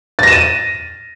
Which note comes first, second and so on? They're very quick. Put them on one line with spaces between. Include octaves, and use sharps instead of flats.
A6 A#6 E7 D#7